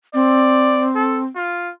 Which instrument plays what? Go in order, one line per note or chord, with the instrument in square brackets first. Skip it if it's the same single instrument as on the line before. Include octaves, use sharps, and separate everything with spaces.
[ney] C4 [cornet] D5
[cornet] A4
F4